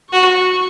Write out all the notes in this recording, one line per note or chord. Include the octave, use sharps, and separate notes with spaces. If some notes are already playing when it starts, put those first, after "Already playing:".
F#4 C#6